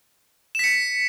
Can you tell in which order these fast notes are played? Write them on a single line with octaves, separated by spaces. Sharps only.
E7 B6 C#7